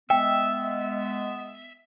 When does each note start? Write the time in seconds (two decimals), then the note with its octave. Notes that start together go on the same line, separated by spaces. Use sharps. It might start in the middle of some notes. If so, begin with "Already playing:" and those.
0.10 G#3 B3 E5 G5